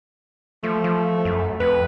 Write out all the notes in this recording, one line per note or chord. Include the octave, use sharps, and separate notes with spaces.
F3 A3
F3
F#2
F2 B4